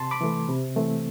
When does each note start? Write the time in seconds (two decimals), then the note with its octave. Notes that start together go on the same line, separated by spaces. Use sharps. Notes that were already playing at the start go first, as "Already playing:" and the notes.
Already playing: C3 A5 C6
0.11 B5 D6
0.21 E3 A3
0.49 C3
0.76 E3 A3 C4